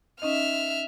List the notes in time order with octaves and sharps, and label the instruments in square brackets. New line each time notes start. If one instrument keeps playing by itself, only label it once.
[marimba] C#4 D#4 D#5 [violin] E5 F6